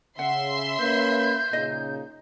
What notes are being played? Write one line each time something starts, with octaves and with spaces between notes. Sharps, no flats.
C#3 E5 F#5 C6
A#3 C#4 B4 G6
A#2 C#3 D#4 D#5